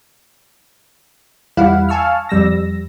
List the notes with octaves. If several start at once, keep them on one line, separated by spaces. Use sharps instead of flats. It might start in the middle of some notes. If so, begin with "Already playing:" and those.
E2 G3 E4 F5 F#5 B5
F5 G#5 A5 C#6 E6 F6
F2 G3 E6 A#6